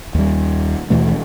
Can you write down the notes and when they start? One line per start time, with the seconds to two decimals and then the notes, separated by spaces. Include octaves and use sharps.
0.15 D#2 G3
0.90 D#2 B2 E3 A3